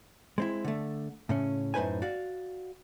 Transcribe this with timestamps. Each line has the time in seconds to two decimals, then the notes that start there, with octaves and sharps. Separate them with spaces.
0.38 G#3 C4 E4
0.64 D3 A3
1.29 A2 C#3 C#4
1.74 F#2 A2 D#4 B4 C5 G#5
2.02 F#4 D5 F5